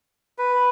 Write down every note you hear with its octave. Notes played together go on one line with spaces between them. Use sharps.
B4